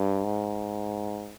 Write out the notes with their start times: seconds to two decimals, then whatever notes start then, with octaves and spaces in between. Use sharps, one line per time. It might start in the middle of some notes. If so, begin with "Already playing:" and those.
Already playing: G2
0.24 G#2